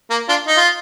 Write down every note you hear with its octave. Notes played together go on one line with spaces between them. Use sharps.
A#3
D4 F4
D#4
F4